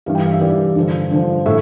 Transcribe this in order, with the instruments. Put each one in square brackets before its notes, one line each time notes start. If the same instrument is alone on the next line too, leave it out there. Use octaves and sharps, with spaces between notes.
[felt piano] G2 E3 G3 F5
G5
F5
E5
G2 E3 G3 D5
G2 D3 F3
G2 D3 F3
A2 E5